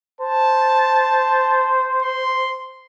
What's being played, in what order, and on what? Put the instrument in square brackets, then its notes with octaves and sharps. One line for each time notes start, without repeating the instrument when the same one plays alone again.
[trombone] C5 [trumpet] A5
[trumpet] C6